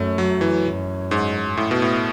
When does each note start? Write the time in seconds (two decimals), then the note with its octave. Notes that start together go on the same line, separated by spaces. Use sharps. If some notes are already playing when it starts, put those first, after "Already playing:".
Already playing: F#2 A3
0.18 F#3
0.41 E3
0.64 F#2
1.11 G#2
1.57 A2
1.71 B2
1.82 A2